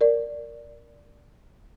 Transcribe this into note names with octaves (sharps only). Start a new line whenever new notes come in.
A#4 D5